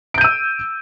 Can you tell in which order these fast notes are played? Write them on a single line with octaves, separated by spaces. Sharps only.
D7 G6 D#7 E6